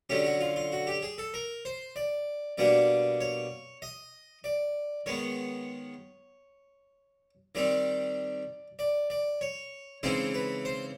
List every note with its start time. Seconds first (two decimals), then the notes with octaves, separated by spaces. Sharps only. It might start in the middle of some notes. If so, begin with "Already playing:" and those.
0.10 D3 F#3 A3 C#4 G4
0.25 F#4
0.41 F4
0.56 F4
0.72 F#4
0.87 G4
1.03 G#4
1.18 A4
1.34 A#4
1.65 C5
1.96 D5
2.58 B2 G3 A#3 D4 D5
3.21 C#5
3.82 D#5
4.44 D5
5.06 D#3 G#3 B3 C#5
7.55 D#3 G3 C4 D#4 D5
8.79 D5
9.10 D5
9.41 C#5
10.03 C#3 E3 G#3 C4 D#4 C5
10.34 B4
10.65 C5